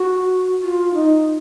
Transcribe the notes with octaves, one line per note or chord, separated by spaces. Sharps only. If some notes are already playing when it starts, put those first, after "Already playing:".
Already playing: F#4
F4
D#4